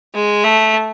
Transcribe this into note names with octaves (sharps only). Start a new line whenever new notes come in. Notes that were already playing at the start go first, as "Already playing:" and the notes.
G#3
A3